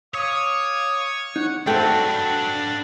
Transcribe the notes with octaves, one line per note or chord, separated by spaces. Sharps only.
C#5 F5 D6 D#6
D#4 F#5
F#3 A3 C4 D4 F#4 B4 G5